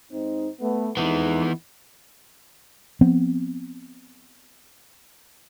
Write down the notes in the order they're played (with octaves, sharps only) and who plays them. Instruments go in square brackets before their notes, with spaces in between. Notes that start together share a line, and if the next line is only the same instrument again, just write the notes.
[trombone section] G#2 C4 D#4
A3 B3
[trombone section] F2 G#3 D#4 [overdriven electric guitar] E3 B3
[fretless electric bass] F3 B3 C4